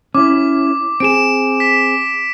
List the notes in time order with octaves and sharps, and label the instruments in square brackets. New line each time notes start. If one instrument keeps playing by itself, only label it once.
[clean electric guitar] C#4 E4 [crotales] D6
[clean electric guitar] C4 G#4 [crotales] D7 E7
[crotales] B6